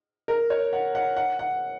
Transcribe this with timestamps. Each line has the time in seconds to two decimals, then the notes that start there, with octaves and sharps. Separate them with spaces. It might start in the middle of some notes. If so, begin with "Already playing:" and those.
0.28 A#4
0.50 C#5
0.73 F#5
0.95 F#5
1.17 F#5
1.39 F#5